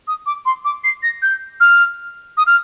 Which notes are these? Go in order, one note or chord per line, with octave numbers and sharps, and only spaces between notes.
D#6
D6
C6
D6
C7
A#6
G6
F6
D#6
F6